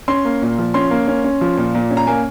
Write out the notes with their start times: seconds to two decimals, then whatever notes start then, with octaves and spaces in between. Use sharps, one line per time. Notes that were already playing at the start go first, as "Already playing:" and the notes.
0.08 C#4 C6
0.25 A#3
0.42 A#2
0.58 F3
0.74 C#4 C6
0.91 A#3
1.08 C#4
1.24 C#4
1.41 F3
1.57 A#2
1.75 A#2
1.91 C#4
1.97 A#5
2.07 A#3 G#5